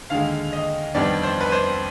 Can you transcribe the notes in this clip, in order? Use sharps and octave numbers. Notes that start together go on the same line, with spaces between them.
D#2 D3 G#3 F5
D#5
F2 D#3 G3 B3 D4 D5
C5
B4
C5